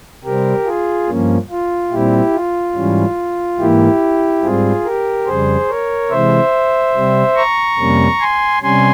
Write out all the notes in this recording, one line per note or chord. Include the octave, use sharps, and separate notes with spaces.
C3 G3 C4 G4 A#4
F4 G#4
G2 F3 A#3 C#4
F4
A#2 G3 C4 E4 G4
F4
G#2 E3 G3 C#4
G#2 E3 A#3 E4 G4
G#2 G3 C4 F4 G#4
G4 A#4
F2 C#3 G3 G#4 C5
A#4 C#5
C3 E3 G#3 C5 E5
C3 G3 C4
A#5 C#6
F2 C3 G3 A#3 C#4
G#5 C6
C3 G3 C#4 G#5 C6